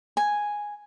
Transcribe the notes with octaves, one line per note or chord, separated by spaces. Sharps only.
G#5